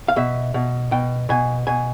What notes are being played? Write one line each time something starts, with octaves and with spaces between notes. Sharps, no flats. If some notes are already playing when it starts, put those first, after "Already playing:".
F5
B2 E5
B2
B2 G5
B2 G#5
B2 G#5